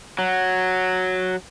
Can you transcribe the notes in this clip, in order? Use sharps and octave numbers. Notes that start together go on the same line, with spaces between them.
F#3